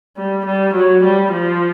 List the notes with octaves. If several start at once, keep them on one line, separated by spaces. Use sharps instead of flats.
G3
G3
F#3
G3
F3